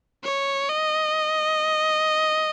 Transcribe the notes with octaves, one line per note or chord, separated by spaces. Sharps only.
C#5
D#5